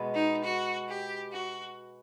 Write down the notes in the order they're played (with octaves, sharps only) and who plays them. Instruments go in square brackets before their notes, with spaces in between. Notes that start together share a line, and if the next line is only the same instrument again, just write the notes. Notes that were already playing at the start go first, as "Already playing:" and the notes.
Already playing: [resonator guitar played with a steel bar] B2 G#3 B3
[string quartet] D#4
F#4
G4
F#4